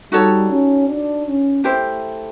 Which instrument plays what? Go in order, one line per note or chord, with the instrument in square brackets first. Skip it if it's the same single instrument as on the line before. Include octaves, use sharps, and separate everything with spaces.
[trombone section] G3 [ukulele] D#4 F#4 A4 C#5
[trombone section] C#4
D4
C#4
[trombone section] A3 [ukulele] E4 G4 C5